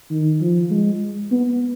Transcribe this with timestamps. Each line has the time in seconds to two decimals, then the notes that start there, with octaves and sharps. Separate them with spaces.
0.10 D#3
0.41 F3
0.70 G#3
1.31 B3